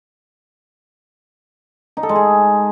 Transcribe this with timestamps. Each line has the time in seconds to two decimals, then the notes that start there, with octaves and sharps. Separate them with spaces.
1.97 D#4
2.03 A4
2.09 G#3
2.15 G#4